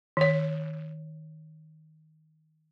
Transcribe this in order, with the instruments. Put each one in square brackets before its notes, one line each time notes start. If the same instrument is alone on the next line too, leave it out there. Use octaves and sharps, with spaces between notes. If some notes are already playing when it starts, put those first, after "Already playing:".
[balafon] D#3 C#5